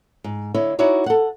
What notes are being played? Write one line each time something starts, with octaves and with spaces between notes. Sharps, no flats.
G#2
D3 E4 C#5 D#5
D#4 E4 F#4 C#5 D5
A4 F#5